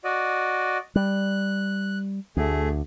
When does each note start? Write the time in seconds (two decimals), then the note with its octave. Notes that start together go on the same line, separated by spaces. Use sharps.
0.04 F#4 D5 D#5
0.96 G3 F#6
2.37 D2 A3 G#4